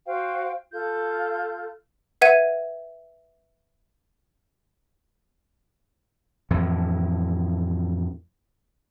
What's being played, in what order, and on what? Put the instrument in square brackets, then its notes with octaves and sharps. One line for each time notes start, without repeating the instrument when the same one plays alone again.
[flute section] F#4 C5 F5 G5
F4 A4 G6
[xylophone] B4 E5 F#5 G#6 D#7
[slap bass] F2 A2 E3